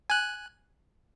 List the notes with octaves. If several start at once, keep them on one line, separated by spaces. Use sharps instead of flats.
G#5 F#6